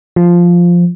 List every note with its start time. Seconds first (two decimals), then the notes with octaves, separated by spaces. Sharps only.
0.16 F3